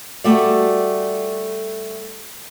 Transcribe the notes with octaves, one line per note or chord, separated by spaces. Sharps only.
G3 A3 F#4 D5